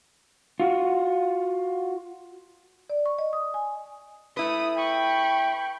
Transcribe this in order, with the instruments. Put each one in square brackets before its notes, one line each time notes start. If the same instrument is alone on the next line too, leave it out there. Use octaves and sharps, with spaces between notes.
[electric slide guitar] F4 F#4
[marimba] D5
C#6
D#5
D#6
G#5
[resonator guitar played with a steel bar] A3 E4 B4 [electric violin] D#6
[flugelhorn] G5 [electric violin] B5 C#6